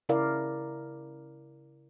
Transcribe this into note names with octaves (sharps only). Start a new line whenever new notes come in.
C#3 E4 A#4 D5 F5